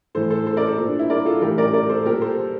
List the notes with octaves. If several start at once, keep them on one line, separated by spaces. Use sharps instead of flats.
A2 E3 A4 C5
A4 C5
A4 C5
A#4 D5
A4 C5
A#2
D4
E4
A#4 D5
F4 A4
A2 E3 G4 A#4
A#4 D5
A#4 D5
A4 C5
A#2 G4 A#4
A4 C5